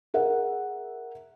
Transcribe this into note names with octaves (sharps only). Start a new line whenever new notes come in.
G#4 A#4 E5 F#5